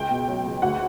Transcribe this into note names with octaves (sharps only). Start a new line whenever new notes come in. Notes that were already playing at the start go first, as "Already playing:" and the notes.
Already playing: C#2 G5
B2
F#3
C#2
D2 F#5